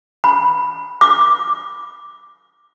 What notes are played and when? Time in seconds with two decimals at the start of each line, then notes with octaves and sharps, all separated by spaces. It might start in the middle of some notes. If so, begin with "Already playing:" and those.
0.24 B5
1.01 D6